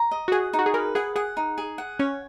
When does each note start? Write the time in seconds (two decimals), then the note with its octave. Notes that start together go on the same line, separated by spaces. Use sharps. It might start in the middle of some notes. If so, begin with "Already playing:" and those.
Already playing: A#5
0.11 D#5
0.28 F#4
0.32 G#4 F#5
0.53 D#4
0.59 F#4
0.66 G#4
0.74 A#4 B4
0.95 G#4 F#5
1.16 G#4 F#5
1.37 D#4
1.58 G#4
1.78 F#5
1.99 C#4 C#5